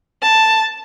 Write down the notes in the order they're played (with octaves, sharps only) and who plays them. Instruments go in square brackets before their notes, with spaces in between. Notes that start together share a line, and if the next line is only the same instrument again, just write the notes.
[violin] A5